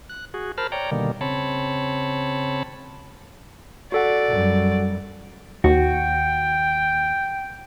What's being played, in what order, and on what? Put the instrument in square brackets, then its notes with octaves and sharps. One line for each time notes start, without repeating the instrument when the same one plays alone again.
[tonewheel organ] F#6
F#4 G#4
A#4 C5 A5 B5 F6
C#5 D5 G5 A#5
B2 D3 D#3 G3 A#3
C#3 C4 C#5 A5 B5
[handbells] F#4 A4 F#5 [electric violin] D5
[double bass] F#2 G3
[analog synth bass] D#2 [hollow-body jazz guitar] F#4 [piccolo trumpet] G5